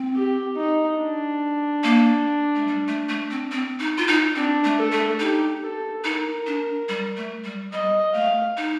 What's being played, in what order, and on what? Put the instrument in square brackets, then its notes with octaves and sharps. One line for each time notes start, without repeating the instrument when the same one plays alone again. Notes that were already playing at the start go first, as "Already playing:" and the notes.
Already playing: [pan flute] C4
[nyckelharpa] G4
D#4
D4
[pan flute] A#3
A3
G3
A3
A3
C4
C4
D#4
F4
D#4
[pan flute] C4 [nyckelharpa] D4
[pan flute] A3
[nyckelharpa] A4
[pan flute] A3
[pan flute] D#4 [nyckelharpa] G4
[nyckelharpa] A4
[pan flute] D#4 [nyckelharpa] A#4
[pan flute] D4
G3
A3
G3
[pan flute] G3 [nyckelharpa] D#5
[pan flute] A3 [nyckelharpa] F5
[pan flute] D#4